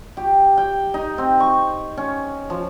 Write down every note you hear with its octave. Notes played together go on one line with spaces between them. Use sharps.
G4
G5
D#4
C4
C#6
C#4
F3